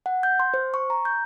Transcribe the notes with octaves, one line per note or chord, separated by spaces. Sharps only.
F#5
G6
C6
C5
C#6
A#5
G6